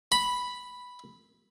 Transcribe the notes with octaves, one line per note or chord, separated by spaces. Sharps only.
B5